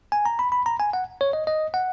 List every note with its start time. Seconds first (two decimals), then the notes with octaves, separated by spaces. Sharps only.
0.12 G#5
0.26 A#5
0.39 B5
0.52 B5
0.66 A#5
0.80 G#5
0.93 F#5
1.21 C#5
1.33 D#5
1.47 D#5
1.74 F#5